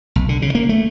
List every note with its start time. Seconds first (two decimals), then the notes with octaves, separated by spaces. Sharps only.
0.16 B1
0.29 D3
0.42 C#3
0.55 A#3
0.69 A3